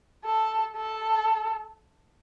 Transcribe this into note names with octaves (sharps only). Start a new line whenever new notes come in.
A4
A4